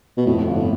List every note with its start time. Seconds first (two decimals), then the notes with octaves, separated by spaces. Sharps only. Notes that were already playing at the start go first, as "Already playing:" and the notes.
0.17 B2
0.26 F2 A2
0.47 G1
0.55 A2